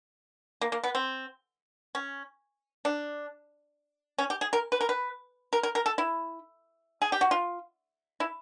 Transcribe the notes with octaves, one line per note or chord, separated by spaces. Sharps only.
A#3
A#3
B3
C4
C#4
D4
C#4
G4
G#4
A#4
B4
A#4
B4
A#4
A#4
A#4
A4
E4
G#4
G4
F#4
F4
E4